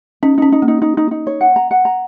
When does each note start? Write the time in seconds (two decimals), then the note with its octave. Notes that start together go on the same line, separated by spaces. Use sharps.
0.23 C#4 D#4
0.38 C#4 D#4
0.52 D#4
0.62 A#3
0.68 D#4
0.82 D#4
0.97 D#4
1.11 D#4
1.27 C#5
1.41 F#5
1.56 A#5
1.71 F#5
1.85 A#5